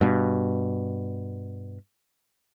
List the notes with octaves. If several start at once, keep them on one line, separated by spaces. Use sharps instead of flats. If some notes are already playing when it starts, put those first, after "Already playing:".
G2 B2